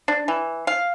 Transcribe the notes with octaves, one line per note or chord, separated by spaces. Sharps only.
D4
E3
F5